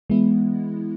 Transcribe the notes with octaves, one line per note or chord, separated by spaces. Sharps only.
E3 G#3 B3 E4